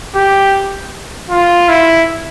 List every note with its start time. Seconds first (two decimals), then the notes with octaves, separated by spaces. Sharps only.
0.15 G4
1.30 F4
1.69 E4